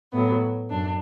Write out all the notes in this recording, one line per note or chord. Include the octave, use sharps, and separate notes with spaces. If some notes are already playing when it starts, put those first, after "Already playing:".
A2 F#3 B3
F#2 D4